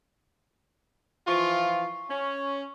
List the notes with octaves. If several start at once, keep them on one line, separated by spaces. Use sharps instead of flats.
E3 F3 F4 C#6
C#4